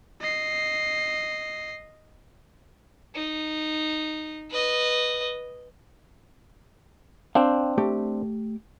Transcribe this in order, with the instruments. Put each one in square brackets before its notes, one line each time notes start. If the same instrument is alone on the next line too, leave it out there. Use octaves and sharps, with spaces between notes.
[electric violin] D#5 C7
[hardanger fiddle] D#4
B4 D#5
[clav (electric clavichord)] C4 D4 [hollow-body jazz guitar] F5 G5
[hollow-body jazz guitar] A3 G4